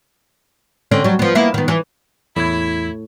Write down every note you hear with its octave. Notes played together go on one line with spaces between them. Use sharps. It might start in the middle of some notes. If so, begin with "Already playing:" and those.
D3 C4 C#4
F#3 G3
F3 B3
A#3 B3 E4
D#3 B3
E3
E2 A2 E4 G#6